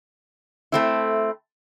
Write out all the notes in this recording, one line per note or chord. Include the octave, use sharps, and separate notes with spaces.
A3 C4 E4